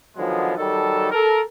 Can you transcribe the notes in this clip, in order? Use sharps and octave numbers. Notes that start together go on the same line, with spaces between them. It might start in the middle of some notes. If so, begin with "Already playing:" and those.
D3 D#3 F3 F#3 G#3 B3
D#3 F#3 G3 A4
A4 A#4